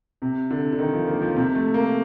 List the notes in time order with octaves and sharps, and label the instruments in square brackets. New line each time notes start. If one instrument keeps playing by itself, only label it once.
[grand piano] C3
D3
D3
D#3
F3
A#3
F3
C3
A3
A#3